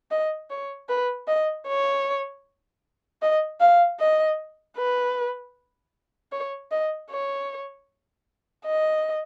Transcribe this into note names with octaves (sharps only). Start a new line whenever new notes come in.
D#5
C#5
B4
D#5
C#5
D#5
F5
D#5
B4
C#5
D#5
C#5
D#5